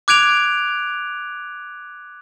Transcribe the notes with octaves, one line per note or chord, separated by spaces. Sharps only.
D6 F#6 G#6 D7 F7